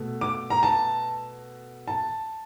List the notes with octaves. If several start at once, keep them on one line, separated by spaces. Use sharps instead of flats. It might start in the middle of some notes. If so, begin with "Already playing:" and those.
Already playing: B2 A3
D6
A#5
A5
A5